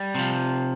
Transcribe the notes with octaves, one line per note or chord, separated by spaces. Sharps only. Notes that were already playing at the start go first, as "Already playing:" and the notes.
Already playing: G3
C3 F3